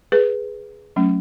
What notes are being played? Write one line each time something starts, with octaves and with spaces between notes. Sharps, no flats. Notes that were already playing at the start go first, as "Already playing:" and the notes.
G#4 B4
F#3 A3 C#4